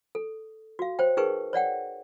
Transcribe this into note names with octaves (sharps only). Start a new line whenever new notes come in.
A4
F#4 F5
C5 C#5 G5
D#4 G#4 A#4 B4 G5 C#6
C#5 D5 F#5 G5